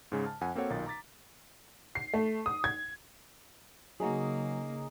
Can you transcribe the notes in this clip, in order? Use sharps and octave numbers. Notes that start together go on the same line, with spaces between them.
G#2 C#3 G#3
A5 F6
F2 F#5 G#5
A#3 C4 F#4 A4 C#5 F#5
B1 A#2 D#3 D#4 A6
A#5 D6 A6 B6
C7
A3
D#6
G#6
C#3 F#3 A#3 D#4 F#4 G#4